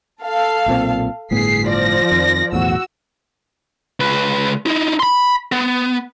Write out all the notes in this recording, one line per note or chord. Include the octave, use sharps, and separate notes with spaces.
A4 F5
B1 A#2 C4
G1 A2 B3 G#4 B6 C7
F3 D5 A#6
F2 D#3
B1 E2 A2 F#4 E6
C#2 B4
D#4 E4
B5 C6
B3